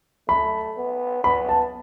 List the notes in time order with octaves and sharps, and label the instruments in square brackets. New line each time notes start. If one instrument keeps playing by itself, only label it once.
[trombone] A3 [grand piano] B5
[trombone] B3
[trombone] B3 [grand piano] B5
[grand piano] A5